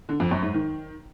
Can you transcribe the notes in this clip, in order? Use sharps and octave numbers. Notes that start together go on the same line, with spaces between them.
D3
F2
F#2
G#2
D#3